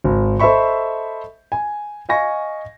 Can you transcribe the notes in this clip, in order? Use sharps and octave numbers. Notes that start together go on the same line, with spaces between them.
G#1
A4 C5 D#5 E5 B5 C#6
G#5
D#5 F5 G#5 C#6 A#6